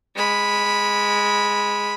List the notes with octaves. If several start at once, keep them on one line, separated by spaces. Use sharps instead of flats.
G#3 B5